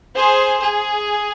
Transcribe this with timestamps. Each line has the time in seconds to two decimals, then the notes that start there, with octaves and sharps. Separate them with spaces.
0.16 G#4 C5
0.61 G#4